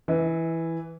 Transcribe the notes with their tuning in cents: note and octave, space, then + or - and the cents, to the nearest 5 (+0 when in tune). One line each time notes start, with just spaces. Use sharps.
E3 +0 E5 -40